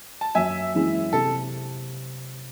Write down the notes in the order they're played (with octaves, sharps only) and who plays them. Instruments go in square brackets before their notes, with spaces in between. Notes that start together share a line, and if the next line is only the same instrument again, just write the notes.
[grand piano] A5
[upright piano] F#2 [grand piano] E5 G#5
[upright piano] E3 G#3 C#4 E4
[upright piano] C3 [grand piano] A4